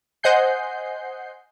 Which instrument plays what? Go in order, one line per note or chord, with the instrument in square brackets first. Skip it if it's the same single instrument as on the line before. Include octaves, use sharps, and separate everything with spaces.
[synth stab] C5 D#5 F#5 G#5 G6 C7